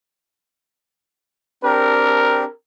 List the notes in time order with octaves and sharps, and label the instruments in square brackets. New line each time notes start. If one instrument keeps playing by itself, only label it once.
[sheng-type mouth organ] C4 D4 G4 [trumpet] A#4